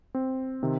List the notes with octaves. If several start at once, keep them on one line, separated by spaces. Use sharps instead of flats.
C4
C3 D#3